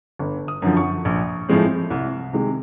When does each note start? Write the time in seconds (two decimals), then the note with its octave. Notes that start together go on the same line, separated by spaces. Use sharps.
0.19 G1
0.48 D#6
0.62 F#2 D3 F3
0.77 C#6
1.05 A#1
1.48 A2 F3 G#3 C4
1.91 C2
2.33 C3 D#3 G#3